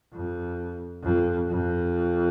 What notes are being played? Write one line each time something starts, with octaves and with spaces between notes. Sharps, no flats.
F2
F2
F2